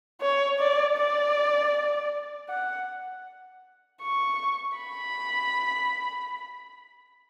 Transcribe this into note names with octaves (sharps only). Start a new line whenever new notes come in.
C#5
D5
D5
F#5
C#6
B5